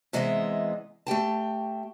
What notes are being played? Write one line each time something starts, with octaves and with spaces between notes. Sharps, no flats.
C3 E3 G#3 B3 D#5 E5
A3 G4 G5 A5